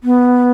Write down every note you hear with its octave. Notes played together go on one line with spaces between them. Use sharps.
B3